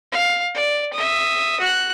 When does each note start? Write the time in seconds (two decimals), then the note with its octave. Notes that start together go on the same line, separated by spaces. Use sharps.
0.12 F5
0.54 D5
0.93 E5 D#6
1.60 F#4 F#6